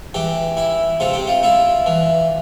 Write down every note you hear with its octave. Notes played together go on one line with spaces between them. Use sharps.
E3 G4
E4
C3 F4
G4
F4
E4 F4
E3